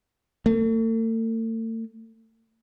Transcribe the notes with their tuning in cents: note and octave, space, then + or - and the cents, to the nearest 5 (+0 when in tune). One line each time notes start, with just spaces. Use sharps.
A3 +45